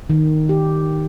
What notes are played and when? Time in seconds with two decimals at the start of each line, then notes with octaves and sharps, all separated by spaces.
0.10 D#3
0.49 G4